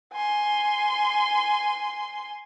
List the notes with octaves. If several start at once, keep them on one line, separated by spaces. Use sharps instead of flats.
G#5 C6